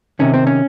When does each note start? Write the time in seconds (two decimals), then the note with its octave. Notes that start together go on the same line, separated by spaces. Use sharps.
0.19 C3 D#3 C#4
0.34 C4
0.47 C#4